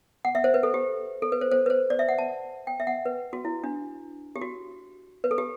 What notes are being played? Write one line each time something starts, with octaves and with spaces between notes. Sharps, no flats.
F#5
E5
C5
B4
A4
G4
A4
B4
C5
C5
B4
C5
D5
E5
F#5
A5
G5
E5
F#5
B4
F#4
E4
D4
G4
F#4
B4
A4
G4